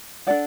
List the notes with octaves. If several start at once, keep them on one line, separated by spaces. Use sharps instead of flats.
D4 A4 D5 F#5